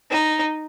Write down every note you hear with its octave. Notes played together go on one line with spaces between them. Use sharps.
D#4